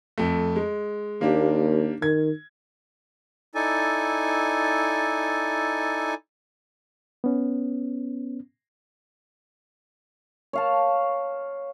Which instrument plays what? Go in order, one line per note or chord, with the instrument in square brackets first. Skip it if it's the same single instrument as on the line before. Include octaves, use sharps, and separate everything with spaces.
[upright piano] F2 A3
G#3
[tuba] D#2 [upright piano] A#3 D4 G4
[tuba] D#3 [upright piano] G#6
[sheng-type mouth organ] D#4 E4 A4 D5 G#5
[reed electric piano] B3 C#4
[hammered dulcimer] C#5 F5 A5